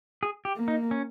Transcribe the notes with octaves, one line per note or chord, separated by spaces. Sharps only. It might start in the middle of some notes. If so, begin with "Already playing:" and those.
G#4
G4
A#3
D#4
C#4